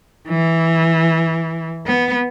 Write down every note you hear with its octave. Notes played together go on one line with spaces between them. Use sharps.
E3
B3